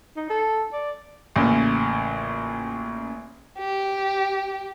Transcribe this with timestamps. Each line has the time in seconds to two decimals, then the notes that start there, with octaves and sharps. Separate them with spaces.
0.16 D#4
0.30 A4
0.73 D5
1.36 A1 A#2 C#3
3.59 G4